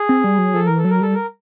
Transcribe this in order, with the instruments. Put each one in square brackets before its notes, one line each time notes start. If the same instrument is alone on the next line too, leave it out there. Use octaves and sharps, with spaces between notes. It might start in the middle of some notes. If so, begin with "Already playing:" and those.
Already playing: [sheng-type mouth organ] G#4
[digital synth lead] C4
G3
F#3
[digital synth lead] F3 [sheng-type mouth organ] A4
[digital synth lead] E3 [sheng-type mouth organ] A#4
[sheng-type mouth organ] A4
[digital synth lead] F#3
[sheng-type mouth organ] A#4
[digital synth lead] G3 [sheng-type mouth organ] A4
[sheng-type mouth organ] A#4